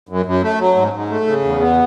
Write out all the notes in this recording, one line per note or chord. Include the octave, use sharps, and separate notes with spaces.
F#2
F#2
A3
F#3
G#2
G#2
A3
C#3
E2
B3